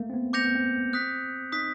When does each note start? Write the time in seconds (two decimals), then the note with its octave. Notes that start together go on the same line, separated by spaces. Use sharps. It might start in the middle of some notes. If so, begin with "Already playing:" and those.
Already playing: A3 A#3
0.10 C4
0.14 B3
0.33 C4 D6 G6 A#6 C#7 F7
0.44 B3
0.55 C4
0.93 D#6 F#6 B6
1.52 D#4 D#6 F#6 B6